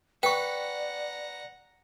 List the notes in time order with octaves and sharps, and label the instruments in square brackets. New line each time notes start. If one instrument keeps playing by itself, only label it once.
[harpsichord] B4 [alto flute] D5 [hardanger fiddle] F#5 A#5 [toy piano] G5 C#6